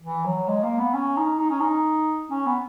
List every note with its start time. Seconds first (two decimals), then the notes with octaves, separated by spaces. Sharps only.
0.03 E3
0.25 F#3
0.48 G#3
0.63 A#3
0.79 B3
0.94 C#4
1.17 D#4
1.39 D#4
1.50 C#4
1.60 D#4
2.31 C#4
2.46 B3